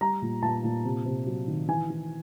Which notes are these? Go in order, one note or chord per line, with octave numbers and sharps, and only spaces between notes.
G3 A#5
A#2
A#2 A5
A#2
C3
C3
F#3
D#3
E3 G#5
E3